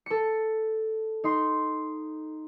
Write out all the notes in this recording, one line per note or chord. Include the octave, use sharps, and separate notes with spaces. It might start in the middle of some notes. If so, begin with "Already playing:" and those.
A4 C#7
D#4 C6